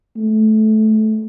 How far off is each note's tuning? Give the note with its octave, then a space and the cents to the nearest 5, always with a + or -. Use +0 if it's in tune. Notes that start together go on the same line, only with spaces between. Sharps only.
A3 -20